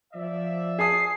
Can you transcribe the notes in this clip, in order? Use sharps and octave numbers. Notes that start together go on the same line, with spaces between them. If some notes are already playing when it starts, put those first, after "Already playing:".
F3 D5 E5
G#4 A5 D#6 C7